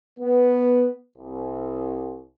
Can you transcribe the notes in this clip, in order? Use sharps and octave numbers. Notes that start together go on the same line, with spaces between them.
B3
C2